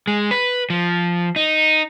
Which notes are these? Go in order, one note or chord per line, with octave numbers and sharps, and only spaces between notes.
G#3
B4
F3
D#4